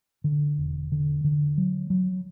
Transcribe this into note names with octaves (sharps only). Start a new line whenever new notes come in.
D3
E1
D3
D3
F#3
F#3